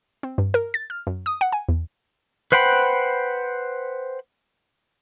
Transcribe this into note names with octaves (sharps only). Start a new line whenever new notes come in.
C4
G2
A#4
A6
F6
F#2
D#6
F#5
G#5
E2
B4 C5 F#5 G5 B5